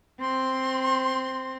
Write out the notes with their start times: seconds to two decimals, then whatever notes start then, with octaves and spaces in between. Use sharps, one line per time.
0.21 C4 C6